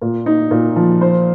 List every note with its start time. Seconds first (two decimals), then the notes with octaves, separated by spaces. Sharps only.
0.02 A#2
0.26 D#4
0.51 A#2
0.76 F3
1.01 C5